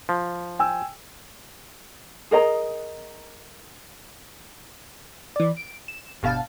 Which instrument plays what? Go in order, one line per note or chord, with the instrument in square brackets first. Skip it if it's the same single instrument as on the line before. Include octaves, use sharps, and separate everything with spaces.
[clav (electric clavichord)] F3
[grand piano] G5 G#5 E6
[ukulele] G#4 A#4 D#5 A#5
[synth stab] E3 D5
D7
E7
G1 B2 F5 A5